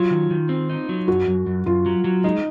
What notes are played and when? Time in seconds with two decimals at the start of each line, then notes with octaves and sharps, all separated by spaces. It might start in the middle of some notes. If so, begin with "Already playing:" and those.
Already playing: F#3 F4
0.11 D#3
0.30 D#3
0.49 C4
0.70 D#4
0.89 F#3
1.08 F#2 F#4
1.28 F#2
1.46 F#2
1.66 F#2 F4
1.86 F#3
2.04 F#3
2.24 G#3 D#4